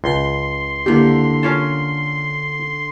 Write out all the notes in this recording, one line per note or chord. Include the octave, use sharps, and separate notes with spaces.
C#2 C6
D3 A#3 E4 G4
C#4 F4 A#4 C#5 F5 A5